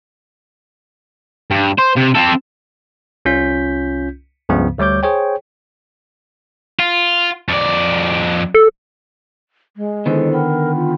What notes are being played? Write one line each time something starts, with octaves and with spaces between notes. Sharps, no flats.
G2
C5
C3
C4 A4
C2 C#4 F4 G6 B6
C#2 G2 C#3 F3 B3
D2 G3 C#5 D6 G6
G#4 C5 C#5 G5
F4
F2 D5
A4
G#3
D3 D#3 B3 E4 A4 C5
A#4 F#5 G5 B5
F4